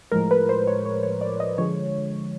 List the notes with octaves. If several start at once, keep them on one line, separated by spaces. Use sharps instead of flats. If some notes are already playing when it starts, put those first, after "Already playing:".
A2 F3 G#3 A#4
B4
C5
C#5
C#5
C#5
D5
D#5
D3 F3 G#3 C#5